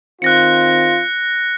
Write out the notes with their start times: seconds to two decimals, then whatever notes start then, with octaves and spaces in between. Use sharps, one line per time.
0.22 D#3 C4 F4 F#6 A#6 C#7